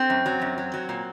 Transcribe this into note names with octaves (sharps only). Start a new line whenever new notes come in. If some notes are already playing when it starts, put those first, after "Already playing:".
Already playing: C4
F#2
F#3
F#2
F#3
F#3
A#2